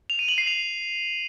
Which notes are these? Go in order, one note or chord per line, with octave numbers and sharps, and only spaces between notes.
F7
D#7
F#7
C7
F7